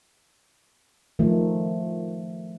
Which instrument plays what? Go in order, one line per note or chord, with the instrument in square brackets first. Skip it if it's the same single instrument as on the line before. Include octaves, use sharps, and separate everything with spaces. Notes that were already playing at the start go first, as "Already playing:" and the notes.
[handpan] D#3 F3 A3